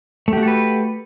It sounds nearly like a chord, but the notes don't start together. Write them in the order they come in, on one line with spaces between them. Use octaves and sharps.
A3 G4 F#4 A4 B4